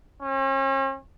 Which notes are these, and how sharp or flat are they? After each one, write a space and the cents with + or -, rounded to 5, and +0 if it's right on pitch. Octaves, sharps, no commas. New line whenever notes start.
C#4 -45